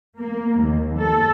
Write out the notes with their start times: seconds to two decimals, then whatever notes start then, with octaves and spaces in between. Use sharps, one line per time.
0.19 A#3
0.59 D#2
0.98 A4